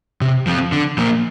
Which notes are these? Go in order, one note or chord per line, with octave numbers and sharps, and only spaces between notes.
C3
F3 C4
D3
F3 A#3